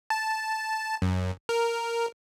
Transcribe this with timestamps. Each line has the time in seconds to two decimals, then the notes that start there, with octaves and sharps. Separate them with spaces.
0.10 A5
1.02 F#2
1.49 A#4